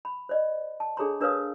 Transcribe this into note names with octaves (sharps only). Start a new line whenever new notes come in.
B5
C5 D5 D#5
A5
D4 G#4 A4 C#5 A#5 C6
D4 A#4 B4 C#5 F5 D#6